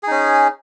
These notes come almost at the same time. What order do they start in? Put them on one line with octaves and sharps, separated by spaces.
G#4 D#4 C#4